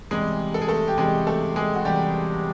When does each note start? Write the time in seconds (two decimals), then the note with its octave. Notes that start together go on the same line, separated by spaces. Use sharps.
0.11 E2 C3 E3 G3 G#3 G#4
0.54 A4
0.62 G#4
0.68 A3 A4
0.88 G4
0.98 E2 C3 E3 G3 G#3 G#4
1.27 A3 A4
1.56 G#3 G#4
1.75 F#4
1.85 E2 C3 E3 G3 G4